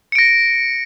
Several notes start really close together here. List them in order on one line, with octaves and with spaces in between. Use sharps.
C#7 D7 A#6